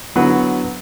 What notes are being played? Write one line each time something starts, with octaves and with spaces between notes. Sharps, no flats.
D3 F#3 B3 E4 F#4 B4